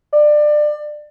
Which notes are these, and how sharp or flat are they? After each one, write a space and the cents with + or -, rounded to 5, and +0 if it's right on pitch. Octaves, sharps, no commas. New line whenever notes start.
D5 +25